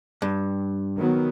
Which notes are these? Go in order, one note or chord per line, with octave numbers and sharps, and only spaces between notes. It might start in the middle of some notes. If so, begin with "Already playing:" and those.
G2
D#3 F#3 B3